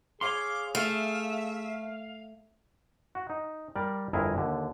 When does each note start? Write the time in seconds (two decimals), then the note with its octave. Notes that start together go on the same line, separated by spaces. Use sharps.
0.21 G#4 C#5 F5 C6 D6
0.75 A3 E5 F5
3.15 F#4
3.30 D#4
3.76 G3 A#4 D5
4.13 G1 F2 E4 G#4 A#4 G#5
4.37 D#2 D3